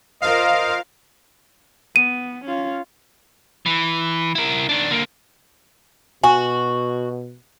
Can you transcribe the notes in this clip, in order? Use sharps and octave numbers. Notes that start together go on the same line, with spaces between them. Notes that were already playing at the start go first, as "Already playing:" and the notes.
F4 A#4 C5 D#5 F5
B3 D#7
C#4 F4
E3
E4 A#4
D#3 D4
D3 A#3
B2 F#4 G#5